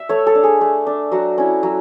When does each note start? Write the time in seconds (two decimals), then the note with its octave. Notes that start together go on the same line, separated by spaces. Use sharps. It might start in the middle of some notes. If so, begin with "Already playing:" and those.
Already playing: E5
0.09 A3 C#5
0.27 A4
0.35 D4
0.43 G#4
0.61 A3
0.87 D4
1.12 F#3 F#4
1.38 C#4 E4
1.63 F#3